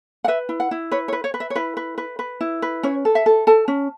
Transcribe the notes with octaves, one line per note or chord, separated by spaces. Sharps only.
F#5
B4 E5
E4
F#5
E4
B4 C#5
C#5
B4
C#5
B4
E5
C#5
E4 B4
B4
B4
B4
E4
B4
C#4 C#5
A4
E5
A4
A4 A5
C#4